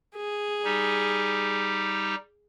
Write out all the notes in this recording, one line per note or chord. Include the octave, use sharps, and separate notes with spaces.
G#4
G3 D#4 G4